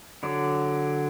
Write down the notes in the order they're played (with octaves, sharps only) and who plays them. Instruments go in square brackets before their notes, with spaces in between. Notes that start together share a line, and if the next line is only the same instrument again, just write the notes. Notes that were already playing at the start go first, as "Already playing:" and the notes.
[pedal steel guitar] D3 F#3 D5